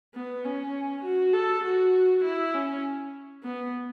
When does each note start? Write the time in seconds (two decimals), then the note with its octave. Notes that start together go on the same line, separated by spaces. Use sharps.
0.14 B3
0.44 C#4
1.04 F#4
1.34 A4
1.64 F#4
2.24 E4
2.54 C#4
3.44 B3